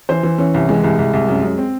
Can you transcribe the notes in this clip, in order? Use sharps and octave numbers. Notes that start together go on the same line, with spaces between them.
E3 C5
E3
E3 C#4
C2
E3 G#3
C2
C2
C2
F#2
F#2
C4